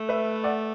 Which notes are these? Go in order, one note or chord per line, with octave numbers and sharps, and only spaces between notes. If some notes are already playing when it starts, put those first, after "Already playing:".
Already playing: A3
B4 E5
D5 F#5